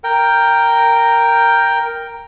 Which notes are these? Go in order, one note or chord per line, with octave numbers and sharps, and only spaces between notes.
A#4 G5